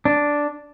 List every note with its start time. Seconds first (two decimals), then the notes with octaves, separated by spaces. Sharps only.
0.05 D4